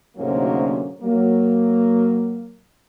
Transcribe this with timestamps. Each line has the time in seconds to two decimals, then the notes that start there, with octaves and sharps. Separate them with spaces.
0.17 D2 G#2 C3 F#3 A#3 C#4
1.02 F#3 A#3